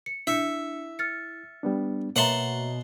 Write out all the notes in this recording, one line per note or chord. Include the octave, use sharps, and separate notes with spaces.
C#7
D4 E4 E5 C#7
F6 A6 C#7
G3 B3 D4
B2 A#3 C#5 E5 F#5 A5 A#5 C6